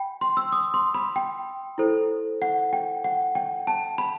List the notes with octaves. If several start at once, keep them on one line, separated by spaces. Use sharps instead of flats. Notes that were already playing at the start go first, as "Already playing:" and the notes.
Already playing: G5 B5
C6
E6
D#6
C6
B5
G5
E4 A4 C5
F#5
G5
F#5
G5
A5
B5